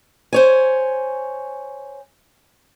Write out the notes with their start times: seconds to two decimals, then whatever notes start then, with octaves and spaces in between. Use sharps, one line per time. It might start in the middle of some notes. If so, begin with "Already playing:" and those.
0.33 C5 C#5 G#5